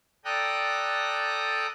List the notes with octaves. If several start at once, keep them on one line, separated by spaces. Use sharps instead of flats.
A4 D5 G5 A#5 D#6 F#6